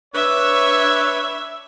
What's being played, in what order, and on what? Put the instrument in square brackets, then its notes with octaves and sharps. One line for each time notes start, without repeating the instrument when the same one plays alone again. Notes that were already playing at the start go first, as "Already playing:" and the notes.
[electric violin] D4 E5 [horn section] B4 C#5